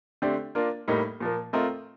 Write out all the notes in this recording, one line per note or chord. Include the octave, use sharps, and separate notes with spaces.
D3 A3 C4 G4 D5
A#3 D4 F4 A#4
A2 G3 A#3 D#4
A#2 F3 A#3
A3 C4 F4 A#4 D#5